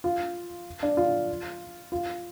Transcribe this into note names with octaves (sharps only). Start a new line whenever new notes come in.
F4
D4
F4
F4